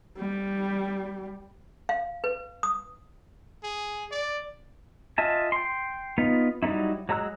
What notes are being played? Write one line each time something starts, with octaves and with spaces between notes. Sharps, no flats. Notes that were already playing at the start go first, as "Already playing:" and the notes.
G3
F5
B4
D#6
G#4
D5
F4 D#5 E5 G#5 A5
G5 C6
B3 D#4 F4
F#3 G3 A#3 D#4 E4
F#3 G#3 A#5 E6 F#6